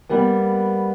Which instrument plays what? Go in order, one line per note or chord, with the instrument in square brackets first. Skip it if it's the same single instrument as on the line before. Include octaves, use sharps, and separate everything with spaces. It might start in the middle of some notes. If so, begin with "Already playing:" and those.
[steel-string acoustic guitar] G3 A#3 B3